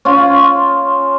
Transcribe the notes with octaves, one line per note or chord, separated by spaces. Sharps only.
C#4 F4